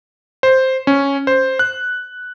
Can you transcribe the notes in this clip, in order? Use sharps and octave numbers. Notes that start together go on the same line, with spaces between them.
C5
C#4
C5
F#6